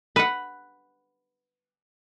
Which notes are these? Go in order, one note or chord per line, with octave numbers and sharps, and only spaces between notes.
B4 F#5